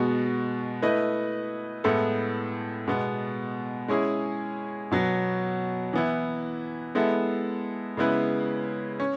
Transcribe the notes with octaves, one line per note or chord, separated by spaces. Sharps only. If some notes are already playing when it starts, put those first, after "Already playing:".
Already playing: B2 G#3 B3 F#4
A3 E4 B4 D#5
A2 G#3 B3 E4 A4
B2 G#3 B3
G#3 C#4 E4 G#4
B2 F#3 B3
E3 B3 E4
G#3 B3 E4 A4 E5
C#3 G#3 B3 E4 B4
C#4